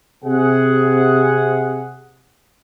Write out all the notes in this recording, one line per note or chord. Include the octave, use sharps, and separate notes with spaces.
C3 G#4 F#5